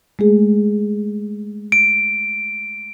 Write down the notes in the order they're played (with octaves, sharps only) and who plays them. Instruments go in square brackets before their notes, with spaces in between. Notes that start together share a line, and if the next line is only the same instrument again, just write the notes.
[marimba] G#3 A3 G#4
[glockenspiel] D7